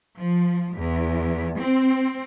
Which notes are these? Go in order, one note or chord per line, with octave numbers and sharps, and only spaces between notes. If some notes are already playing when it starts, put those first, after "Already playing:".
F3
E2
C4